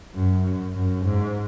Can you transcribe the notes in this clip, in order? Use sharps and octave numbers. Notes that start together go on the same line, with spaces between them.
F#2
F#2
G#2